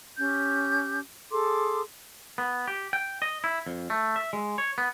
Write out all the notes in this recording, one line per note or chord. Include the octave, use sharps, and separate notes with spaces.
C#4 G4 G6
G#4 A4 C6 D6
B3
G4
G5
D#5
E4
F2
A3
E5
G#3
C#5
B3